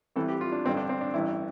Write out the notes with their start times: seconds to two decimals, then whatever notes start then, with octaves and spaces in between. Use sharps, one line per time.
0.16 C2 C3 E3 A4
0.28 G4
0.41 F4
0.52 D4
0.65 A1 G2 D3 C4
0.77 D4
0.89 C4
1.01 D4
1.14 A1 G2 E3 E4